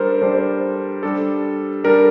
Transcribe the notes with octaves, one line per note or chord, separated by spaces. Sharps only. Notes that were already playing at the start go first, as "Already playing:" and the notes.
Already playing: G3 D4 A4 A#4 C5
G3 D4 A4 C5
G3 D4 A4
G3 D4 A4 A#4